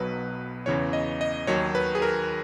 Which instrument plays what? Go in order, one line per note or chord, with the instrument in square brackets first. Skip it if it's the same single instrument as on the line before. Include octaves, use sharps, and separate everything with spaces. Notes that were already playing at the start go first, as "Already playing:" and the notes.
Already playing: [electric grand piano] B1 B2 F#3 B4
E2 C#3 E3 C#5
D#5
D#5
D#2 D#3 F#3 C#5
B4
G#4
A#4